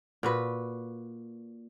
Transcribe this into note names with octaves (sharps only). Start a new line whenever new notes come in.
A#2 F#4 B4